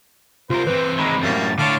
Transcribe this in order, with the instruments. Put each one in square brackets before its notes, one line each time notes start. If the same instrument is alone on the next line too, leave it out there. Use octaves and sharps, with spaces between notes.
[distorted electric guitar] C2 A#4 [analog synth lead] F4 [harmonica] C5
[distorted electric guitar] E3 C4 [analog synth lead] B4
[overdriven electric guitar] D#3 G#3 [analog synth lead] B5
[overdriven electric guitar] F#2 A2 [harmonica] G3 A#3 [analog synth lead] A6
[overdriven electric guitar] A2 C#5 [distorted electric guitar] D3 [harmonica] F5 A5 D6